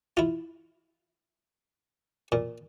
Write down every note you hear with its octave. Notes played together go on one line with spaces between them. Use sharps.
E4 F4
A#2